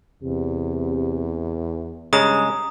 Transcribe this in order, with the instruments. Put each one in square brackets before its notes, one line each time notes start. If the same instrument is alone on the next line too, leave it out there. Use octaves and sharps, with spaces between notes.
[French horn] E2 [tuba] C3
[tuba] G2 [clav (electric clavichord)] C#3 G#3 [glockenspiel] A#5 D#6